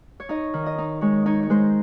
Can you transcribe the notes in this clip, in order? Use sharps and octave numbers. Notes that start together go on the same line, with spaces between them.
C#5
D#4 D#5
D#3
D#5
D#4
G#3 C#5
D#4 C#5
C#5
G#3 C5